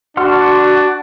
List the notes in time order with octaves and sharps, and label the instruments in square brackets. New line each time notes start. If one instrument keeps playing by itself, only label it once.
[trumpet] D4 [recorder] F#4 [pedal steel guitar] F#5 C6 F6